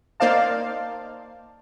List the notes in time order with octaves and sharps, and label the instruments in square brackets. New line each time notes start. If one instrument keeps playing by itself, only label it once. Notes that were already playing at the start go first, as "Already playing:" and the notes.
[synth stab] A#3 D#4 C5 D5 F5 A5